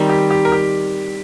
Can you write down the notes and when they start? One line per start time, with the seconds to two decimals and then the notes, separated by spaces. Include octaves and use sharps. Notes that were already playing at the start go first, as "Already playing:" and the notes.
Already playing: D#3 G3 C4
0.10 G4
0.30 G4
0.45 A#4
0.52 G4